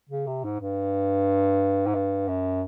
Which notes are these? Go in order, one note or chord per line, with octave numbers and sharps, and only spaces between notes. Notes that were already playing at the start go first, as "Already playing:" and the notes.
C#3
C3
G#2
G2
G#2
G2
F#2